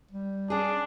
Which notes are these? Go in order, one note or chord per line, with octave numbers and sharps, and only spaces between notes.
G3
C#4 D4 G#4